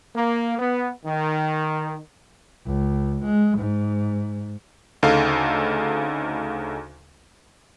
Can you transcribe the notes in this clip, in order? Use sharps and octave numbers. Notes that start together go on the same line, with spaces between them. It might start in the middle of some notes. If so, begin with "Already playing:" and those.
A#3
B3
D#3
C#2
G#3
G#2
D2 C#3 D#4 A4 F5